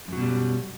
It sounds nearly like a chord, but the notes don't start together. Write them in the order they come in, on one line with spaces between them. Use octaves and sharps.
F#2 F#3 B2 G3